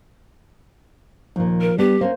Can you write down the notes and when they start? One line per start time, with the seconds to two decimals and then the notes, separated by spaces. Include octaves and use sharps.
1.36 D#2 A#2 F3
1.61 A#4
1.78 G3 B3 D4 G4
2.01 A#3 C4 C#4 C5